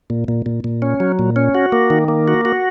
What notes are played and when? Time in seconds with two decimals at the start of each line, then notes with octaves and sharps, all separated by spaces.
0.10 A#2
0.28 A#2
0.46 A#2
0.64 A#2
0.82 C#4
1.00 F#3
1.19 A#2
1.36 C#4
1.55 F#4
1.72 A#3
1.90 D#3
2.08 A#3
2.28 F#4
2.45 F#4